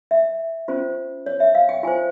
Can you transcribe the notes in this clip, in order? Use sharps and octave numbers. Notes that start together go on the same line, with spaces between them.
E5
C#4 F4 C5
C#5
E5
F5
G5
F4 C5 G#5